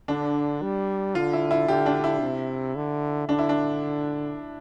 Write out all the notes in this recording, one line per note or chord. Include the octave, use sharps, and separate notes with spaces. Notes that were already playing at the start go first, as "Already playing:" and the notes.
D3 D4
G3
D3 F4
E4
E4
D3 G4
D4
E4
C3
D3
D3 D4
E4
D4